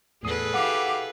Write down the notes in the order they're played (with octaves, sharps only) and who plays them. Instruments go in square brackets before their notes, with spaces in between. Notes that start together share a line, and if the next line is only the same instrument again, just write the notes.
[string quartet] E2 [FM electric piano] A2 D#6 C7 [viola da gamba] G#4 A4 B4
[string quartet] E4 G4 F5 [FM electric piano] F#5 [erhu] D6